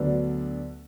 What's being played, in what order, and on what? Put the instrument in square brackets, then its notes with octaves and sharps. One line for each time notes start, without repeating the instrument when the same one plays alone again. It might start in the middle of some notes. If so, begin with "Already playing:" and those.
Already playing: [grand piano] D2 D3 F#3 B3 D4